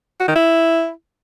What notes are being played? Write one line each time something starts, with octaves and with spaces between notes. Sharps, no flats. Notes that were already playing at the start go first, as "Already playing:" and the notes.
F#4
D#3
E4